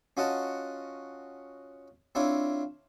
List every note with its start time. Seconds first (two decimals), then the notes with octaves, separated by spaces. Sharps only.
0.17 C#4 F4 F#4 D#5 F#5 A5
2.15 C4 D4 E4 F4 C#5